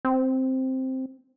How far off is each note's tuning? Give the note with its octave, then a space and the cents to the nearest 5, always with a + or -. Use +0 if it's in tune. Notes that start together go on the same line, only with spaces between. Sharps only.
C4 +0